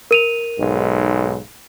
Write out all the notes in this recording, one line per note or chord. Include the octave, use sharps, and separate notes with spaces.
A#4 D#7 F7
B1 G#2